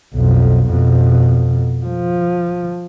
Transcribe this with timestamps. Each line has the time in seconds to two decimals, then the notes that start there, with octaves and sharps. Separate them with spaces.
0.14 B1 F2
0.70 F2 B2
1.86 F3